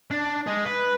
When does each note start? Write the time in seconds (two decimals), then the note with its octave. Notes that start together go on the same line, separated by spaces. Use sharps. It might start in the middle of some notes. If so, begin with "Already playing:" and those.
0.11 D4
0.47 G#3
0.65 B4